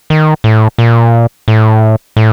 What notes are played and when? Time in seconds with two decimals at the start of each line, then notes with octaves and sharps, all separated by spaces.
0.10 D#3
0.44 A2
0.78 A#2
1.48 A2
2.17 A2